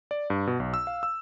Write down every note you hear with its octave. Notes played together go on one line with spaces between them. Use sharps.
D5
G2
B2
B1
E6
F5
E6